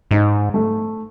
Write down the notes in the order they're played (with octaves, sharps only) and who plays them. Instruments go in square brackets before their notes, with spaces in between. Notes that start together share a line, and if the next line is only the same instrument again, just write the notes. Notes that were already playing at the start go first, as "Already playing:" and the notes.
[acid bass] G#2 [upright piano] D#4
[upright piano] A3